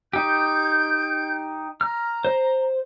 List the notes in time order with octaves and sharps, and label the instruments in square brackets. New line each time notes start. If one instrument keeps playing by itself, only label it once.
[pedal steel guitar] D#4 G4 [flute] G6
[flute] A#5 [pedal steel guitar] F6
[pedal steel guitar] C5